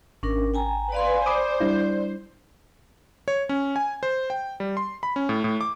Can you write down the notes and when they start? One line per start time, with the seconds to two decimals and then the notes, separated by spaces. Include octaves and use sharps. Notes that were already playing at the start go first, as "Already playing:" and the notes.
0.23 G#1 C#4 D4 A#4
0.54 G5 G#5 A#5
0.92 B4 D5 F5 G#5 C6
1.26 C5 D5 B5 D6 D#6
1.60 G3 D4 E4
3.28 C#5
3.49 C#4
3.76 G#5
4.03 C5
4.30 G5
4.60 G3
4.77 C6
5.03 B5
5.16 C#4
5.29 A2
5.44 A2
5.61 D6